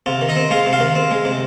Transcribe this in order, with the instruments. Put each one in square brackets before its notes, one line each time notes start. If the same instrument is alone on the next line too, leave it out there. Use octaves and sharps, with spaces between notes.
[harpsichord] C3 F4
D#3
D#4 D#5
C4
G#3 F4 F5
C3
F4 F5
D#3
C4
G#3
C3